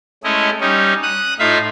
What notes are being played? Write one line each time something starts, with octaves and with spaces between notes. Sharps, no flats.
G#3 A3 C#4 E4 D#5
G3 C#4 D#4
D#6 F#6
A2 D#4 F4 E5 F5